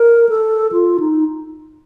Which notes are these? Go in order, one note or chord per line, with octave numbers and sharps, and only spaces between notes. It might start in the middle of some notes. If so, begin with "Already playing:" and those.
Already playing: A#4
A4
F4
D#4